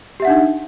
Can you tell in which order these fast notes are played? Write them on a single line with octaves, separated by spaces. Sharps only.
G4 E5 F#5 D4 D#4